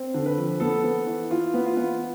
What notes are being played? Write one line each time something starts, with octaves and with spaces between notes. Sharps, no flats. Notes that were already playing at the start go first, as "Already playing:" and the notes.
Already playing: C4
D3
B4
F3
B3 A4
B3
E3
E3 F4
B3
F4
B3